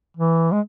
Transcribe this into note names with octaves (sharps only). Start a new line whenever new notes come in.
E3
G#3